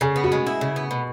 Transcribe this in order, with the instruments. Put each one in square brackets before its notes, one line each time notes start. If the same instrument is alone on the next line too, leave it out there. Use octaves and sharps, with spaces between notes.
[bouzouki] C#3 [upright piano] G#4
[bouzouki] B3
[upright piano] F#4
[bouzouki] G#3
E4
C#3
B3
B2